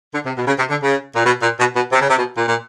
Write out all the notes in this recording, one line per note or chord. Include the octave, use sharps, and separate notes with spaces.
D3
C3
B2
C#3
C3
D3
C#3
A#2
B2
A#2
B2
B2
C3
C#3
C3
B2
A#2
A#2